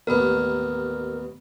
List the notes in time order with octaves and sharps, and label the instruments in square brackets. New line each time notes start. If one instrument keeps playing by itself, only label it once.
[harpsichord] A1 D#2 B3 [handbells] A#4